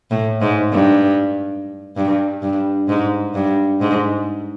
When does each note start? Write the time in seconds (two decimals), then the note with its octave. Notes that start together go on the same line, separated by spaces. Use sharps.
0.11 A2
0.41 G#2
0.72 G2
1.96 G2
2.42 G2
2.89 G#2
3.34 G2
3.81 G#2